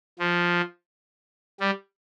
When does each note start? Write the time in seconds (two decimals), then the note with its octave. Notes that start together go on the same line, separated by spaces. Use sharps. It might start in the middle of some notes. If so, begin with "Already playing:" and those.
0.19 F3
1.60 G3